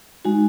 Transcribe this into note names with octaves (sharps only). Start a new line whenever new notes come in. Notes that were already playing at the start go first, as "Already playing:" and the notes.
G#3 D#4 F#4